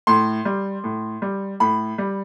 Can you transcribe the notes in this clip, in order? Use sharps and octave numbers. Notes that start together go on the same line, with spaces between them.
A2 C6
G3
A2
G3
A2 B5
G3